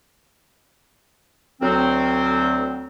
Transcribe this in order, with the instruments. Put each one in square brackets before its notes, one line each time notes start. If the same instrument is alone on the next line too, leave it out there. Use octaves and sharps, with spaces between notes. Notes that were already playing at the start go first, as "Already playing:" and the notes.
[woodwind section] D2 F#3 C4